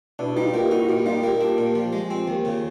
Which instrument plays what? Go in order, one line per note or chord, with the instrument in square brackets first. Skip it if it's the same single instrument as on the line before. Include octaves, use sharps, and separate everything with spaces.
[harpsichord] B2 [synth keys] D4 E4
[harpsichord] G3 [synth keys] D#4 F4
[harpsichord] A#3 [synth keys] F4 G4
[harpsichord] D#4 [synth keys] E4 F#4
[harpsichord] A#2 [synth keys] F4 G4
[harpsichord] G3 [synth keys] D#4 F4
[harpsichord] A#3 [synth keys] F4 G4
[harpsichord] D4 [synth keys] F4 G4
[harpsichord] A#2
F3
G#3
C4
D#2
C#3